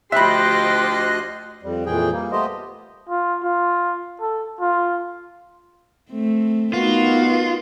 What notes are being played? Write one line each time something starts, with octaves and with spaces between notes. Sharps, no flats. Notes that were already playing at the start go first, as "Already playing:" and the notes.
D2 F3 G4 D#5 E5 B5 C6 F#6
F2 G3
F2 A#2 E3 G#4 G5
G3 A#3
A3 B3 F4 G4 C5 D#5
F4
F4
A4
F4
A3 C4
B3 D#4 F4 F#4 A#4